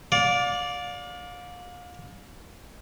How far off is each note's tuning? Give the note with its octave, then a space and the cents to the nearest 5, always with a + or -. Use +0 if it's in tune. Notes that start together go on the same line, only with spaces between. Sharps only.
D5 -10 F5 +35